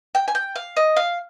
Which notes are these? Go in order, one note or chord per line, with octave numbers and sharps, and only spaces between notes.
G5
G#5
G5
F5
D#5
F5